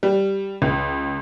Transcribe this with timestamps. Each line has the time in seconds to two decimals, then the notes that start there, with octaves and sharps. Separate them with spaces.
0.03 G3
0.62 C#2